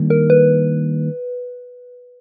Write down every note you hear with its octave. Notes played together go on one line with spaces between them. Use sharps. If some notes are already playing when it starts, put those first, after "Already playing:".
Already playing: D#3 G3 A#3 D4
A#4
B4